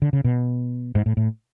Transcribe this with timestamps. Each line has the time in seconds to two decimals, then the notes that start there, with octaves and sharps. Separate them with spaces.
0.02 D3
0.13 C#3
0.24 B2
0.95 G#2
1.06 A2
1.17 A2